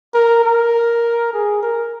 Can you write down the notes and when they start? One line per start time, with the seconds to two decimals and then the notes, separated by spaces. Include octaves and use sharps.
0.14 A#4
0.44 A#4
1.33 G#4
1.63 A#4